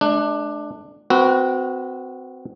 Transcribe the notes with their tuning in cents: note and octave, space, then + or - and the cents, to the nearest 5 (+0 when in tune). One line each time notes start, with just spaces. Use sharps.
A3 -40 D4 +15
C4 -25 F#4 +0 B4 -35